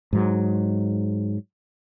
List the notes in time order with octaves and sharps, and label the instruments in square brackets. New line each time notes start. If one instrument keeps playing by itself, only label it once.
[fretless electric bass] G#2 F#3